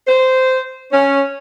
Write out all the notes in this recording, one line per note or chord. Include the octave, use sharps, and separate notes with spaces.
C5
C#4